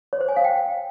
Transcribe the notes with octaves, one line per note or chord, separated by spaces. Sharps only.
C#5
C5
G#5
F5
G5